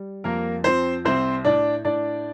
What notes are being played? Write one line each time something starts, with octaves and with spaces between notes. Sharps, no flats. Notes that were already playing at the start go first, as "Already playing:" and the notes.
Already playing: G3
F2 A#3 A#4
F3 C4 C5
C2 C4 C5
A2 D4 D5
A2 D4 D5